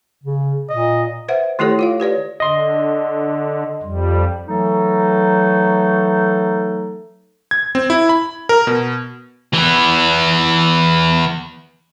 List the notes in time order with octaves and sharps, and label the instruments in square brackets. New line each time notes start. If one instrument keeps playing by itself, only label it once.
[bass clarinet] C#3
[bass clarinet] A#2 [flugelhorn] D#5
[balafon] B4 C5 E5 F#5
D#3 A3 E4 G4 A4 C#5
F4 C#5 F5
G4 B4 C#5 D5
[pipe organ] D3 [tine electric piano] D#5 C6
[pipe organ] F2 G3
[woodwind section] E3 F#3 A3 D#4 A4
[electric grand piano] G#6
C4
E4
B5
A#4
B2
[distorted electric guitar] E3 B3